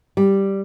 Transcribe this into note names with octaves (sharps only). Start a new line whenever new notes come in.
G3